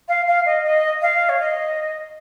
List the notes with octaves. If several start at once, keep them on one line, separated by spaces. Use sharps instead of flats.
F5
F5
D#5
D#5
F5
C#5
D#5